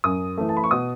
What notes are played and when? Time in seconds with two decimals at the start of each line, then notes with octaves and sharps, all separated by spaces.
0.04 F#2 D#6
0.38 E3 A3
0.49 A5
0.57 B5
0.64 C#6
0.71 B2 D#6